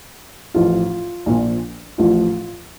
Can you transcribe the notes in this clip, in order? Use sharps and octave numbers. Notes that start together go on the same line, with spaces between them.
A1 A2 F3 F4
A#1 A#2 F3
A1 A2 F3 F4